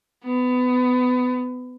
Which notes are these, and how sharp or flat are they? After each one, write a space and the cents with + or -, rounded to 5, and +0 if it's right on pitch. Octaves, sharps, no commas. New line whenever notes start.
B3 +25